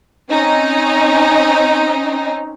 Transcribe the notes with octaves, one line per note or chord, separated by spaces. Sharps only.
C4 C#4 D#4